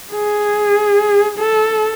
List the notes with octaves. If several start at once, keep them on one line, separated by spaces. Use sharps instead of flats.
G#4
A4